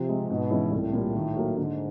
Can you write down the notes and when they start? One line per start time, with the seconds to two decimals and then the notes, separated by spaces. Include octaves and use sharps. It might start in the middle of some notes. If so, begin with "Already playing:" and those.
Already playing: C3 F3
0.08 G#3 C4
0.29 G#2 B2
0.50 E3 G#3 C#4 E4
0.72 C2 A2
0.93 A#2 G3
1.14 D#3
1.36 F#3 A#3
1.57 G#2 D3